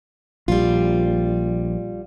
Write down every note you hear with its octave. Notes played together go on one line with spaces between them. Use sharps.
A#1 G3 F4